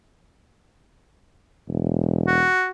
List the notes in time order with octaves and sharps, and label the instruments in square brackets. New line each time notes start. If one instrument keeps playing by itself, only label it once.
[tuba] E1
[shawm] F#4